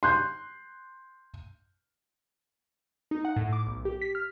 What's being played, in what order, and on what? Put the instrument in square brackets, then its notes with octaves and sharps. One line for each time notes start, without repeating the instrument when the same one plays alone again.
[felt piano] C6 F#6 G6
[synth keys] D#4
F#5
A2
D6
B1
G4
B6
F6